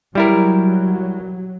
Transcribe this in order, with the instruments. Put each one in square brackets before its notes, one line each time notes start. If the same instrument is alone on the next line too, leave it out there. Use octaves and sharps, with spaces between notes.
[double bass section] F#3 [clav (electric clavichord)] G3 E4 A#4